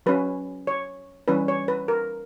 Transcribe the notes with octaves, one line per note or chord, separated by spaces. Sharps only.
F#3 C#4 B4
C#5
E3 G3 C#4 B4
C#5
B4
A#4